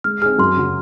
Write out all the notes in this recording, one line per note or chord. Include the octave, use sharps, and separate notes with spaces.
G#3 F6
C4 D#4 G#4 F6
F#2 C6
C#3 F#3